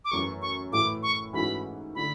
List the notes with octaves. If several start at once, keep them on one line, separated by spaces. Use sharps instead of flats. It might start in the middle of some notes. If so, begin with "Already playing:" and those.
D6
F#2 E3 A3 C#6
C#6
A2 E3 A3 E4 D6
C#6
G#2 E3 A3 C#4 F#4 B5
D3 A3 B5